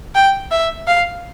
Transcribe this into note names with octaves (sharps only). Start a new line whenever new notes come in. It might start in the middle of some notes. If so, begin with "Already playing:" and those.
G5
E5
F5